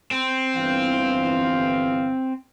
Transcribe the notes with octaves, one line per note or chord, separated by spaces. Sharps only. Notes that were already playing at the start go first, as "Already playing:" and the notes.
C4
G1 E3 F5